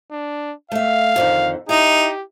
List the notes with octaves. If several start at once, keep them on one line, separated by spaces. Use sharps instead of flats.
D4
A3 E5 F5
F2 D3 D#3
D#4 E4 G4 E5